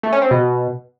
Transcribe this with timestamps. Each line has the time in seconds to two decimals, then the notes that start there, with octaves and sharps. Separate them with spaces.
0.03 A3
0.13 C#4
0.22 C4
0.31 B2